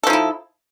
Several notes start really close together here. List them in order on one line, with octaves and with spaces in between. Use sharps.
A4 F3 D#4 E4